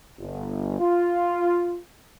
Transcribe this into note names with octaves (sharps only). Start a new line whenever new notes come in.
G1
F4